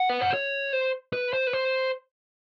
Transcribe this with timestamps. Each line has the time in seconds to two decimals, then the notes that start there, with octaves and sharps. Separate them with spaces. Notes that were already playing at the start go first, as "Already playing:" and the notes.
Already playing: F#5
0.09 B4
0.21 C5
0.34 C#5
0.73 C5
1.13 B4
1.33 C5
1.47 B4
1.53 C5